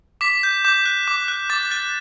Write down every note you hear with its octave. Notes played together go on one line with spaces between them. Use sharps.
D6 B6
G6
D6 G6
F#6
D6
F#6
D6 A6
F#6 A6